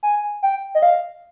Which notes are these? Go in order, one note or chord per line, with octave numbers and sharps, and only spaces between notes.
G#5
G5
D#5
F5